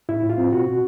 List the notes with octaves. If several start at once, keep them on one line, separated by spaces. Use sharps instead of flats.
A2 E4
A2
F4
C4
B2 F#4
B2